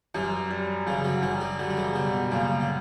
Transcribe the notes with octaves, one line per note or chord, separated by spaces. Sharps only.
F#2 E3 G3
G3
F#2 C#3 E3
D3 F#3
F#2 E3 G3
D3 F#3
D3 F#3 G3
D3
C#3 E3
B2 D3 G3
B2
F#2 A#2 C#3
D3